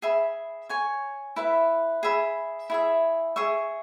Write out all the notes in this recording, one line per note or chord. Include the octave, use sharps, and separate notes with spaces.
G#4 E5 B5
C#5 G#5 C#6
E4 B4 E5
G#4 E5 B5
E4 G#4 E5
G#4 E5 C#6